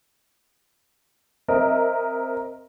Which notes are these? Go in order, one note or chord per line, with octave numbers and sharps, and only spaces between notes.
C4 A#4 D#5 E5